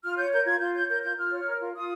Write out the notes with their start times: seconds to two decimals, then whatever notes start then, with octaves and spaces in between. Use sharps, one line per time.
0.03 F4 F6
0.17 C#5 G6
0.32 A#4 G6
0.46 F4 G#6
0.60 F4 G6
0.74 C#5 G6
0.89 A#4 G6
1.03 F4 G6
1.17 F4 F6
1.31 C#5
1.46 A#4
1.60 F4
1.75 F4 D#6